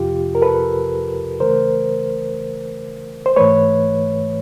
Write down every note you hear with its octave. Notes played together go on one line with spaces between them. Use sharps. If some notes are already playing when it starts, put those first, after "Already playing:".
Already playing: F2 C3 F3 F4 G4
A#4
A4 B4
C#3 E3 A3 A#4 C5
C5
G#2 E3 A3 B4 C#5